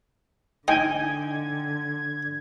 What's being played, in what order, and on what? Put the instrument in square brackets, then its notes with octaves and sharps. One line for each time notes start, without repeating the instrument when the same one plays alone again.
[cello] D3 [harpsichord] D#4 [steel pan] G5 G#5 [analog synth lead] G#6